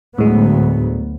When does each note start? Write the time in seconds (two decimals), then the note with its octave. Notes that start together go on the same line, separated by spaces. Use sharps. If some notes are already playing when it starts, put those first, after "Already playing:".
0.18 D2 A2 F#3 G#3 B3